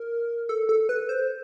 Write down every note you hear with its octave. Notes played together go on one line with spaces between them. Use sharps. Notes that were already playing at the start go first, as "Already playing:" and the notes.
Already playing: A#4
A4
A4
B4
C5